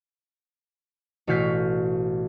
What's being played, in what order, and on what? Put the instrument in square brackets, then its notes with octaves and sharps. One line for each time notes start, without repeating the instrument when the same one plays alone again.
[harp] A1 B2 F#4 F5 G6 B6